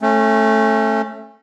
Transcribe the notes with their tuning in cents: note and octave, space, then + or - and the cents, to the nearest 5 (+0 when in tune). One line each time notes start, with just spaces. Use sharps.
A3 +0 C#4 -30